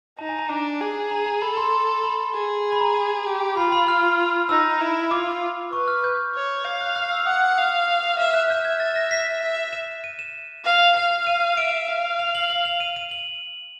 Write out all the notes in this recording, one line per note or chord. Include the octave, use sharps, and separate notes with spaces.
D#4 A5
G#5
A5
D4 A#5
G#4
A#5
A#5
A4 B5
C6
B5
G#4
B5
A#5
G4
F4 B5
B5
F6
D#4 E6
E4
F4 D6
B4 C#6
F6
G6
C#5
F5 G6
F#6
F6
E6
F#5 D#6
F5
F6
E5 F6
F#6
E5 G6
G#6
A6
A#6
B6
E5
E7
D#7
E7
F5
F5 F7
D#7
E5 D7
F5
F7
F#7
F#7
F7
D#7
D#7
F#7